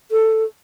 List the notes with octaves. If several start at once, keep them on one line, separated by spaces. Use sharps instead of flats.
A4